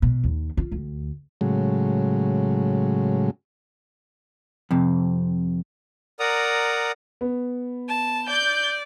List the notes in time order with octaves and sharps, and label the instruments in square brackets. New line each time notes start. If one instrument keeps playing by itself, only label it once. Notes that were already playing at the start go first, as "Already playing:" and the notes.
[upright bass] B2
D#2
F4
D2
[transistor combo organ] A2 C#3 F#3 G#3
[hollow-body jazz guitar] F2 C3
[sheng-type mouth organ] A#4 D5 F#5 A#5 D#6
[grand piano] B3
[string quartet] A5
[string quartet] D5 [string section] G6